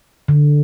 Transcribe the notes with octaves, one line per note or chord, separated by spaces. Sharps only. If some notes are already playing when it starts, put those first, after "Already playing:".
D3